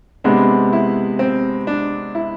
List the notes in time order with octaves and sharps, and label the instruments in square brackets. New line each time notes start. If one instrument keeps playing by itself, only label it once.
[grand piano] C3 G#3 B3 [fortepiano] D4
[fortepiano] E4
C4
D4
E4